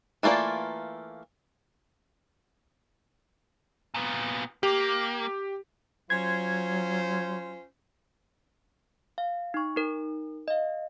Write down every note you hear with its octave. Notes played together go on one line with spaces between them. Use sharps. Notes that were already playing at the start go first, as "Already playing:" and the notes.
E3 A3 A#3 F4 D5
A#2 B3
A#3 G4
F#3 C#4 F4 C5 G#6
F5
D#4 C#6
D#4 A#4
D#5 F5